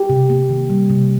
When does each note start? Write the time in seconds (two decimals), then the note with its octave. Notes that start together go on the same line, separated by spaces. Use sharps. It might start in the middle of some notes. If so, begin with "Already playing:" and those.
Already playing: G4
0.10 C3
0.30 A#3
0.50 D#3
0.70 G3
0.90 C3